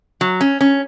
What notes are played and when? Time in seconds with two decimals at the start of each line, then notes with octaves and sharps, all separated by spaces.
0.21 F#3
0.41 C#4
0.61 C#4